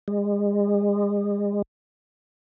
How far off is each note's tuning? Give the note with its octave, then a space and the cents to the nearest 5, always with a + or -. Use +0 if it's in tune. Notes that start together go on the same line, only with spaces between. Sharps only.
G#3 -35